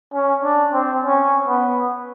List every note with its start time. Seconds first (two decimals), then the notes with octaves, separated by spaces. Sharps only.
0.13 C#4
0.43 D4
0.73 C4
1.04 C#4
1.48 B3